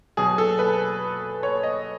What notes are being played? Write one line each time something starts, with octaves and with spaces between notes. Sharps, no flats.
B2 F#3 G#4
A4
B4
C#5
D#5